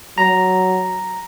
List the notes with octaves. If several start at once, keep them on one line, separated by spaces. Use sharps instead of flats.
F#3 A#5